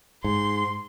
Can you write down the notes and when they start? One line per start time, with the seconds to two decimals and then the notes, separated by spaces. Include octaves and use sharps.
0.24 G#2 C6